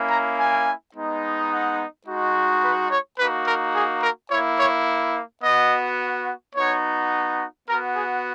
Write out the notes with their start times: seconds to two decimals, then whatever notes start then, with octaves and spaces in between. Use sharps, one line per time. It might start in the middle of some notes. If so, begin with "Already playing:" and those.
Already playing: A#3 C#4 E4
0.10 A#5
0.38 G#5
0.95 G#3 B3 D#4
1.50 F#5
2.07 G#3 D#4 F#4
2.63 B4
2.91 C#5
3.19 A#3 D#4 F#4 B4
3.47 A#4
3.75 G#4
4.02 A#4
4.31 A#3 E4 C#5
4.59 C#5
5.43 B3 F#4 D#5
6.55 B3 D#4 F#4 C#5
7.67 B3 F#4 A#4
7.95 G#4